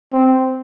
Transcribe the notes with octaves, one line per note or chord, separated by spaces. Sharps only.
C4